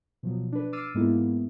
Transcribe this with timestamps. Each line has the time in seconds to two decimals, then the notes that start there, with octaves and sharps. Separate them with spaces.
0.23 B2 F3 F#3
0.52 D4 B4
0.73 D6 E6 F6 A6 C7 D#7
0.95 G#2 G#3 A#3 B3 E4